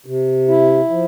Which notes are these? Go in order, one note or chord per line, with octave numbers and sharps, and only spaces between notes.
C3
E4
F3